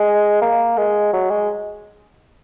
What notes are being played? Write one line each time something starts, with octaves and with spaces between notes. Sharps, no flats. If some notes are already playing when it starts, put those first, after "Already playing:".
Already playing: G#3
A#3
G#3
F#3
G#3